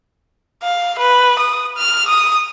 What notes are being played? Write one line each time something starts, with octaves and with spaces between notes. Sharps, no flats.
F5
B4
D#6
F6
D#6